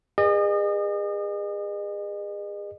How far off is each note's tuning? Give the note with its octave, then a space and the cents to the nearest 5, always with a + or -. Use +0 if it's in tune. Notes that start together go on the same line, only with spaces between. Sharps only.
G#4 -30 B4 -45 D#5 -40